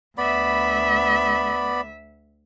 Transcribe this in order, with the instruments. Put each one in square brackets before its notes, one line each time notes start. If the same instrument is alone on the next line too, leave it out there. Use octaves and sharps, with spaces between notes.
[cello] D2 E5 [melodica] B3 D5 B5